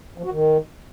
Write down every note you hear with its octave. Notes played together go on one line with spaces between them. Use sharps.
F3
F#4
D#3